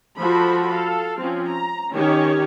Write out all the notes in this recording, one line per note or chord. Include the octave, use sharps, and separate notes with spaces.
F3 F#4 A4 C5 B5
A4 F5
F3 C4 C#4
A#5
D#3 C#4 G4 C#5